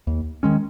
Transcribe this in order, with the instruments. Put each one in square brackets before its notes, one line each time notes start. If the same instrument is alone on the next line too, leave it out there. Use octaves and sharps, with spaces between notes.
[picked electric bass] D#2
D#3 G#3 C#4